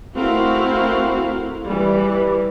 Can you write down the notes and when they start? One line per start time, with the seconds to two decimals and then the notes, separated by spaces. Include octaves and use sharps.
0.17 A3 C4 E4 F#4 A#4 F5
1.65 E3 G3